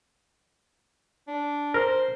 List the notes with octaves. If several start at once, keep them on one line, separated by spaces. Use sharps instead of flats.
D4
A#4 C5